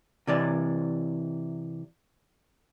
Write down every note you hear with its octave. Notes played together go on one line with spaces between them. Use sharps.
C3 E3 D5